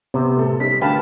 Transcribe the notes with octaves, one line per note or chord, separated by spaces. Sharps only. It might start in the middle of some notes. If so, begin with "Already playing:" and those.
C3 B3 C4 C5
A2 A4
G3 C#4 D#4 B6
D2 A#4 B4 F5 G5 A5 F6